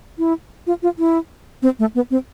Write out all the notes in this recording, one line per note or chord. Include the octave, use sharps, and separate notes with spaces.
E4
F4
F4
E4
C4
A3
B3
C4